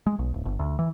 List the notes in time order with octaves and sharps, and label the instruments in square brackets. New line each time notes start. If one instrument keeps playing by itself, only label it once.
[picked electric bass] G#3
B1
D1
G1
D2
E3